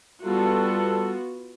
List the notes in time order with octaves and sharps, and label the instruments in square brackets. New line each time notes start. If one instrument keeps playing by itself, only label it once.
[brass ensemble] G3 A4 [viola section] B3 F4 F#4